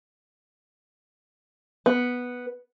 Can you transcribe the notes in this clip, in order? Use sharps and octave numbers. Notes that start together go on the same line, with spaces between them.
B3